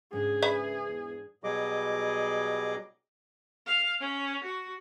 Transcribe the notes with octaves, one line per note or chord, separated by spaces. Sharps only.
G#2 C#3 D4 G#4
B4 E5 B5
E2
B2 F#3 G3 G#4 D#5 D6
F5
C#4
F#4